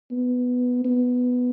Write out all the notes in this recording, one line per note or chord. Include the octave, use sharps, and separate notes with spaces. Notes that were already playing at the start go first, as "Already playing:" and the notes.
B3
B3